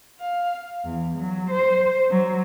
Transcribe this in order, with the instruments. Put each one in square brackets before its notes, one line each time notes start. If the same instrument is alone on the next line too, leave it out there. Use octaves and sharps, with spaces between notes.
[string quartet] F5
E2
F#3
C5
F#3